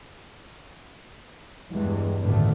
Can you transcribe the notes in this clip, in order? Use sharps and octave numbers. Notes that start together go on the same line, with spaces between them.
E2 G2 E3 G#3
A1 D2 A2 D3 D#3 A3